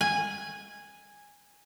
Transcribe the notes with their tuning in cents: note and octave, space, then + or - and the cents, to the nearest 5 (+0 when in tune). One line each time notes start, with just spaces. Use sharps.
G#5 -10